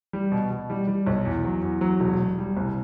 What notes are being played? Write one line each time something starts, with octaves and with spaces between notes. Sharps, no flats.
G3
B2
B2
G3
G3
B1
E2
F#3
E2
F#3
E1
E1
G3
C2